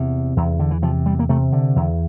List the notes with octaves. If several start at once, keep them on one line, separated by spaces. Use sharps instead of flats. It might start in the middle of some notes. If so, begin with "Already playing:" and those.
Already playing: E2 C3
E2
D3
E3
C3 F3
G3
A#3
C3 A3
D3
E2